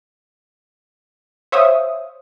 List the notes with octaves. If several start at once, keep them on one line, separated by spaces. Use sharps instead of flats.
C5 C#5 E5 F5 C#6 D#6